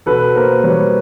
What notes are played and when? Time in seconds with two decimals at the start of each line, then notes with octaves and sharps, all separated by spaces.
0.06 B2 A4 B4
0.35 A#3 A#4 C5
0.64 G3 B4 C#5